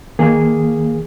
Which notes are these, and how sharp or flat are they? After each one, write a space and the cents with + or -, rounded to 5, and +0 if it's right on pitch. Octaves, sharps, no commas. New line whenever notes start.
D#3 +15 A#3 +0 G#4 -10